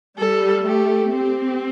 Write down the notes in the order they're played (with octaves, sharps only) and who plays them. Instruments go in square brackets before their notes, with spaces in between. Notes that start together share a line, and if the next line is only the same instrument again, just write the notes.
[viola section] G3 [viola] A4
[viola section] A3 [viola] G4
[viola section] C4 [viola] G4